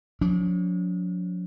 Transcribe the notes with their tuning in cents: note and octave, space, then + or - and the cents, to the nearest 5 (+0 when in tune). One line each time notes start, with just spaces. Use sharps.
F#3 -45 D4 -40